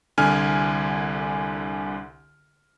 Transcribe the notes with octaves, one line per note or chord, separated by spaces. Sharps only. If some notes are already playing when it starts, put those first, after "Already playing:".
C2 D3 G#5 F6